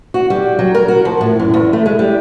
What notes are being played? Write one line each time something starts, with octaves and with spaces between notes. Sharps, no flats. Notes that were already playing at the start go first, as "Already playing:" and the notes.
F#4
G3
F#3
A#4
F#4
F3
A2
F#2
E2
A3
G#3
G3